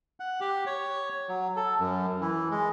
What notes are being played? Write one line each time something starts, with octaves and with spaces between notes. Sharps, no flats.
F#5
G4
C#5
F#3
A4
F#2
E3
G#3